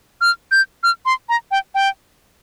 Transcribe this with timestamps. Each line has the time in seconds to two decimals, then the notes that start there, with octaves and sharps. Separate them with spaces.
0.21 F6
0.52 G6
0.83 F6
1.06 C6
1.29 A#5
1.51 G5
1.75 G5